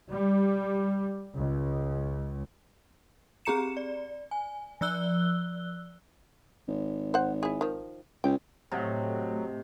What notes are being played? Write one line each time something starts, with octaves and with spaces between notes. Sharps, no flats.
G3
C#2
C4 G4 G#4 A#5 C#7 E7
D5
G#5
F3 D5 E6 F#6 G7
G#1
C5 F#5
E4 G#4
D#3 F3
C#2 G5
A2 C3 F#3 A3 D#5